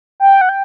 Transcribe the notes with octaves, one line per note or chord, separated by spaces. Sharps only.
G5
F#5
G5